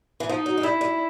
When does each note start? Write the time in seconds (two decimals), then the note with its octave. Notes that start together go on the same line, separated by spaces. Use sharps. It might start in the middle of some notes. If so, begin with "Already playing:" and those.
0.20 E3
0.29 F3 D#4
0.46 F#3
0.57 G#3
0.63 G3 E4
0.81 G3